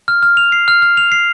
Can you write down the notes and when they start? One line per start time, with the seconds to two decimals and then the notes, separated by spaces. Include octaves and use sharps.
0.08 F6
0.23 F6
0.37 F7
0.52 C7
0.68 F6
0.82 F6
0.97 F7
1.12 C7